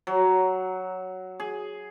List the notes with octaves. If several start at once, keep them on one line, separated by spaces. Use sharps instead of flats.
F#3
G#4